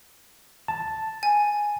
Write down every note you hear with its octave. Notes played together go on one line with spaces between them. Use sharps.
A5
G#5